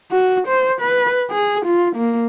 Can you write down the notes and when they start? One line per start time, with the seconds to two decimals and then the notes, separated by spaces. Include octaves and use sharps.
0.11 F#4
0.48 C5
0.81 B4
1.30 G#4
1.66 F4
1.96 A#3